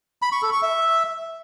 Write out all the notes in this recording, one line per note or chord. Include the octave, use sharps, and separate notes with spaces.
B5
C#6
A4
C#6
E5